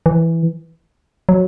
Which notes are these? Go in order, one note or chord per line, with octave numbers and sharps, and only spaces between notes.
E3
F#3